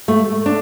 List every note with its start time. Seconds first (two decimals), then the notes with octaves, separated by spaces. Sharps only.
0.08 A3
0.46 D4